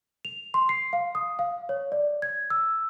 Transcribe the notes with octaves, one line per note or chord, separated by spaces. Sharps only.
F7
C6
C7
F5
D#6
F5
C#5
D5
G#6
E6